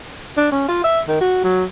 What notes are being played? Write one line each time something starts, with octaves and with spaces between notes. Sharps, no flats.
D4
C#4
F4
E5
D#3
F#4
F#3